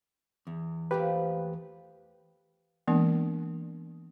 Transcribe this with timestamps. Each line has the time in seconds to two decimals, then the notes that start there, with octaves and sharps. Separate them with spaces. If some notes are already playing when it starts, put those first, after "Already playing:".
0.47 E2
0.91 F3 A3 A#3 G4 B4
2.87 E3 G#3 A#3 B3 D4 A#4